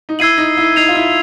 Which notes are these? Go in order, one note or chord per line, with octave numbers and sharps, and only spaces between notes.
D#4
E4 E6 G#6 C7 D#7 F#7
D#4
E4
D#4 G#6 C7 F7
F4
E4